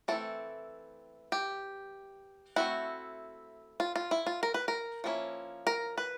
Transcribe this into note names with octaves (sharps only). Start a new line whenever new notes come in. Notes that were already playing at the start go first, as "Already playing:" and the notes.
E3 A3 C4 E4 A4
G4
A3 C4 E4 F#4
F4
F4
E4
F4
A#4
B4
A#4
F3 A#3 C#4 E4
A#4
B4